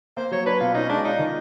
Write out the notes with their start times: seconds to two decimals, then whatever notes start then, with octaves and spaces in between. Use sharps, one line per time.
0.17 A#3 C5
0.31 F#3 C#5
0.46 D4 B4
0.61 B2 F4
0.75 C#4 D#4
0.89 G#3 D4
1.04 D#4 F4
1.19 D#3